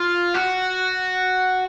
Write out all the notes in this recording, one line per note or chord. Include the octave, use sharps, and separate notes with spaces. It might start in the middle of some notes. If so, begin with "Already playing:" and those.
Already playing: F4
F#4